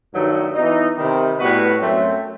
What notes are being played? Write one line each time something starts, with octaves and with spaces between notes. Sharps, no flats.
G2 D#3 F#3 A3 D#4
E3 B3 D#4
C3 D#3 G3
A2 G3 B3 F#4 B4
F#2 F#3 A3 C4